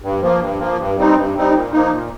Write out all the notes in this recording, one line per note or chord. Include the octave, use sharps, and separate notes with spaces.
G2
F3 A#3
G2
F3 A#3
G2
G3 C4 D#4
G2
G3 C4 D#4
A#2
F3 A#3 D#4
A#2